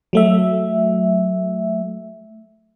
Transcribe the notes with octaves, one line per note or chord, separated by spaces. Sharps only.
F#3 A3 E5